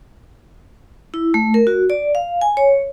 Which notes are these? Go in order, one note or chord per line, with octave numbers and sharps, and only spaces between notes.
E4
A3
A#4
F#4
D5
F5
G#5
C#5